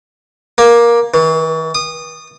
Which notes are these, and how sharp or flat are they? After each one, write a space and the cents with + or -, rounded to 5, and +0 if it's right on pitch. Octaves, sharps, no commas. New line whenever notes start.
A#3 +15
E3 -40
D#6 -20